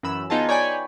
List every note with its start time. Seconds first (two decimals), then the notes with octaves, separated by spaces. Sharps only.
0.03 F#2 E3 B5 E6
0.30 B3 D#4 F4 G#4 A5
0.49 C#5 D5 G5 G#5 B5